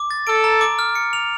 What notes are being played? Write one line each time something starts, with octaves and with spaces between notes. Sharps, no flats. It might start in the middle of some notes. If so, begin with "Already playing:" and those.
Already playing: D6
A6
A4 D7
A#5
D6
F6
C#7
F7